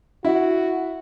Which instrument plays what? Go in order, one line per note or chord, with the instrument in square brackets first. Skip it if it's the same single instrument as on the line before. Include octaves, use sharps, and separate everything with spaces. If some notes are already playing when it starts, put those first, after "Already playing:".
[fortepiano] E4 [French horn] F#4